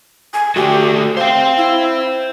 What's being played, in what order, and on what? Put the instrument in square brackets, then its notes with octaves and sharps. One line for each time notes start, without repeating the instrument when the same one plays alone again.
[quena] G#5
[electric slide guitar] A3 F#4 [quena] G4
[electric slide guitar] C5 G5 [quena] F5
[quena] E4